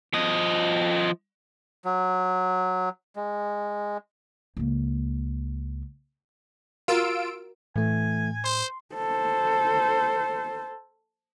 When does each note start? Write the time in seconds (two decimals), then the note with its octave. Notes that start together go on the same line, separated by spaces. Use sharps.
0.14 F3 D#5
1.85 F#3
3.16 G#3
4.57 C#2 A#3
6.88 F4 F#4 A#4 E6 D7
7.76 A2 E3 A3 G#5
8.44 C5 C6
8.95 A4 C5